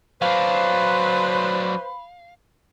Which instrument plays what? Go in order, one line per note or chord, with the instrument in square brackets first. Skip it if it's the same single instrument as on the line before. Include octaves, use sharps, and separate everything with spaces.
[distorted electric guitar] F#3 D4 [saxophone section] B4 C5 [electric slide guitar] F5 [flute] B5